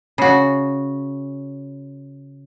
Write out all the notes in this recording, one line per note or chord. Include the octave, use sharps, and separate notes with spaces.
C#3 F#4